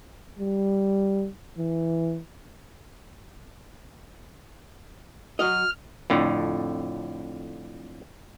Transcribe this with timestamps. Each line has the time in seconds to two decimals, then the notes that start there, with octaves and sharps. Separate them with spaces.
0.39 G3
1.58 E3
5.39 F#3 F#4 D#5 F6
6.10 F2 A2 D3